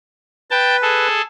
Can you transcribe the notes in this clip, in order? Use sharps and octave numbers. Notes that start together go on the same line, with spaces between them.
B4 G5 A5
G#4 A4